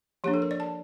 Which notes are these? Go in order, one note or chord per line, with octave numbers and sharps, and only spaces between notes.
F3 A#3 D4 G4
A4
A#4
D5
A5